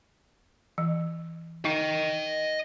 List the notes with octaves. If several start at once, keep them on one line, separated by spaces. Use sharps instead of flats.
E3
D#4 D#5 G5